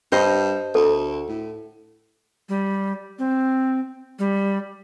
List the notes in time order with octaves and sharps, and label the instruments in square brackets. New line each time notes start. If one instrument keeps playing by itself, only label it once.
[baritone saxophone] G2 [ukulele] C5 D#5
[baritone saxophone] D2 [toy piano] A4
[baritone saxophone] A2
[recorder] G3
C4
G3